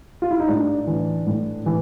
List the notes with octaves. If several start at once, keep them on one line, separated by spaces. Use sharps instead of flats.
F4
E4
D#4
A2 D4
E3
A2
E3